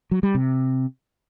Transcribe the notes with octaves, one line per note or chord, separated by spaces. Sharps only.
F#3
G3
C3